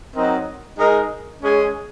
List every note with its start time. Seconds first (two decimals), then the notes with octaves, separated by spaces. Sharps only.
0.15 F#3 C4 D#4 A#4 D#5
0.79 G#3 D#4 A#4 D#5
1.42 G#3 C#4 G#4